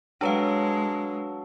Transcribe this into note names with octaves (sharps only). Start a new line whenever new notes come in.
F#3 G#3 D4 A4 B4 F5